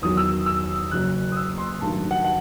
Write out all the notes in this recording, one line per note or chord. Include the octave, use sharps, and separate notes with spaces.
E2 D#3 F#3 D#6
E6
E6
F#1 F#2 F#3 F#6
D#6
E6
C6
A1 G2 D#3 F#3 A5
F#5
F#5